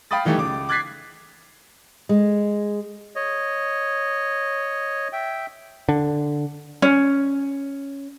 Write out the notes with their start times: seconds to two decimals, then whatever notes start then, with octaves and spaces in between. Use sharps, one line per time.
0.11 F5 G5 B5 D#6 A6
0.25 D#3 E3 G3 A3
0.38 C#2 D6
0.69 D6 F#6 G#6 A6 B6 C7
2.09 G#3
3.15 C#5 D#5
5.13 E5 G5
5.89 D3
6.82 C#4